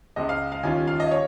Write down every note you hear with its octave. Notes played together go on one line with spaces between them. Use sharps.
C#2 C#3 G#3 D#5
F5
F5
D#2 D#3 G3 C#4 F4 G#5
F5
D#5
C#5